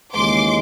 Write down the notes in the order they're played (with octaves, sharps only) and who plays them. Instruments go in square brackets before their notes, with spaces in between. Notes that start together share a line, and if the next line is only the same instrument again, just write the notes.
[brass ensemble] D#2 C#3 E3 G#3 [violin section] C6 D6